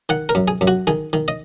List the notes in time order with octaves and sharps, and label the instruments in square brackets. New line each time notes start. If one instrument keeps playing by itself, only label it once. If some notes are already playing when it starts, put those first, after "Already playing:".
[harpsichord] D#3 F#5
A#4
F#2
G#4
F#2
F#4
D#3 G#4
D#3
D#5